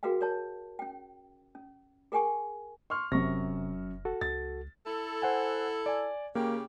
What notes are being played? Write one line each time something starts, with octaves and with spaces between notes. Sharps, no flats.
F#4 G#4 A#4 B4 F5 G5
A#4 C#5 A5
C#4 G5
C#4
G#4 A#4 G5 G#5 C#6
C6 C#6 F6
F1 F#2 C3 C#6 A#6
F#4 A4
C#2 A6
E4 A4
C5 F#5 G#5
D5 G#5
C#3 A#3 G4